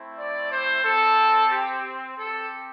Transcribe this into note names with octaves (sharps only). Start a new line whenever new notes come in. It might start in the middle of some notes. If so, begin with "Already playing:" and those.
Already playing: A3 C4 E4
D5
C5
C4 G4 A4
G4
C4 G4 A4